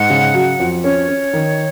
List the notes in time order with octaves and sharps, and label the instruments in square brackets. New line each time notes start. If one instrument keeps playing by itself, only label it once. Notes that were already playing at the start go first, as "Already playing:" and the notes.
Already playing: [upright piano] G#2 [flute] F#5
[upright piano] C#3
F#3
F2
[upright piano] C#4 [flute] C#5
[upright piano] C#4
D#3